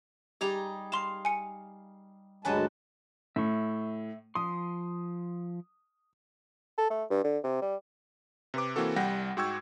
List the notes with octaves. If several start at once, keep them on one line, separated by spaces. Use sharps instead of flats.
G3 D#4 G4 G#4 F7
F5 C6 E7
G#5 C#7
D2 G2 F#3 G#3 B4 G#5 A5
A2 E5 C#6
F3 C6 D#6
A4
A3
G2
D3
C3
G3
C3 B4 D6
E3 A#3 C4 F#4 A4
C2 G3 F#5 G5 A#6
G#2 F#4 G5 C#6 E6 G#6